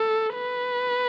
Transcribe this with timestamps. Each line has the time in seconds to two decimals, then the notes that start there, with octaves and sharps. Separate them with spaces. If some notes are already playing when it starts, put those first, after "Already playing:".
Already playing: A4
0.35 B4